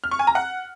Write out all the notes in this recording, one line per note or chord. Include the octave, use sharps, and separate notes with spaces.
F6
C#6
G#5
A#5
F#5